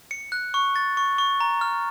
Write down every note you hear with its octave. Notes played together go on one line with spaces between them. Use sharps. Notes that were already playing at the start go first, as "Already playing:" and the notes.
C#7
F#6
C#6
A6
C#6
C#6
A#5
F6